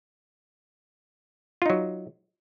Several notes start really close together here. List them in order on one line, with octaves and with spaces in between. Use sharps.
F4 D#4 F#3